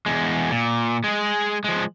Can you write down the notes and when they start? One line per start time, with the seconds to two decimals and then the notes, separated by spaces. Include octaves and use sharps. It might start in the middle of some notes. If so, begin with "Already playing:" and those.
0.06 E2 G#3
0.51 A#2
1.04 G#3 G#4
1.64 F3 G#3